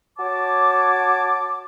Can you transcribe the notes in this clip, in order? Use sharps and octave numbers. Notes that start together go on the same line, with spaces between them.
F#4 C#5 A5 D6